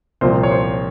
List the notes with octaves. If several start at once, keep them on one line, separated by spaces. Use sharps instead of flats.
C2 A#2 F3 C5
C#5
C5